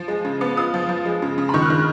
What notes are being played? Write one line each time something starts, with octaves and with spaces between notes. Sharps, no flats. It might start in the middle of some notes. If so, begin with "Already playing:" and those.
Already playing: F3
G#3
C#3
B3
F4 D#6
F3
F3
G#3
C#3
C#3
B5
D#3 C#6
F#6
D#3 F6